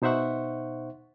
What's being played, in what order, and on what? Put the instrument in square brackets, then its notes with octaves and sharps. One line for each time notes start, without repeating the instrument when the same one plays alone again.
[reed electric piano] B2 D#4 C5 E5 F#5 C#6